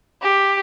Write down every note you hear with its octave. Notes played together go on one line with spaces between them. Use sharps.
G4